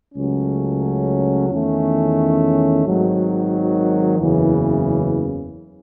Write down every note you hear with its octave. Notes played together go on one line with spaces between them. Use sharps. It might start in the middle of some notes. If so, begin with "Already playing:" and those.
C#2 C#3 F#3 A3 C#4
E2 D#3 A3 C#4
G#1 G#2 D#3 F#3
F#1 E2 C#3 E3